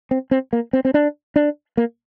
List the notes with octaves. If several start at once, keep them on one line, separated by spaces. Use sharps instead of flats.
C4
C4
A#3
C4
C4
D4
D4
A#3